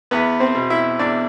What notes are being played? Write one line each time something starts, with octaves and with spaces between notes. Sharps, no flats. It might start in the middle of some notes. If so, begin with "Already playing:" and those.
E2 B3 B4
C4 C5
B2
E4 E5
E2 D4 D5